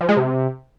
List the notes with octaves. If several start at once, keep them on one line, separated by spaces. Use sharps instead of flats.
F3
G#3
C3